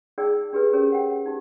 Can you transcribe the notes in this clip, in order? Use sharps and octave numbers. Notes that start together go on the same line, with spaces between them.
D#4 G#4 D5 G5 D6 E6
D4 G4 G#4 B4
C#4 G4 G#4 A#4 C#5
F#5 G5
D#4 G4